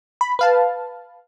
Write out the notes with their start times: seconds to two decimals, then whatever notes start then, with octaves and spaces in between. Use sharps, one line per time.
0.21 B5
0.39 B4 F5 A5